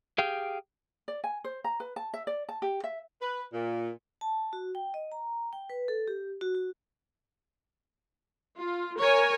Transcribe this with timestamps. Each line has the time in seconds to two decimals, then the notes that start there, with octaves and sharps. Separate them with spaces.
0.18 G4 G#4 F5 G5
1.08 D5
1.24 G#5
1.44 C5
1.64 A#5
1.80 B4
1.96 A5
2.14 E5
2.27 D5
2.49 A5
2.62 G4
2.84 E5
3.21 B4
3.53 A#2
4.21 A5
4.53 F#4
4.75 G5
4.94 D#5
5.12 A#5
5.53 G5
5.70 B4
5.88 A4
6.08 G4
6.41 F#4
6.55 F#4
8.58 F4
9.00 A#4 C#5 G#5